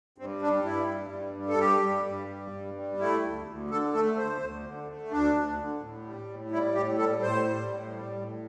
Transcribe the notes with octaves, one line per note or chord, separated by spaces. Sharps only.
G2 C4
G3 D4
G2 E4
G3
G2
G3
A4
G2 G4
G3
G2
G3
G2
G3
A3 E4
D2
D2
D3 A4
A3 A4
D2 C5
D2
D3
A3
D2 D4
D2
D3
A2
G3
A2
G3 E4
A2 G4
G3 A4
A2 C5
G3
A2
G3
A2